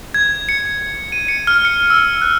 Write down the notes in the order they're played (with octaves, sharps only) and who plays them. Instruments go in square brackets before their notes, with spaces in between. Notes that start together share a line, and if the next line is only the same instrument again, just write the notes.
[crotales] G#6
C#7
C#7
D#7
C#7
F6
C#7
E6
F#6